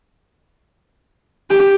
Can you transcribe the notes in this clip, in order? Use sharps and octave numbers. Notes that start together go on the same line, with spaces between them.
G4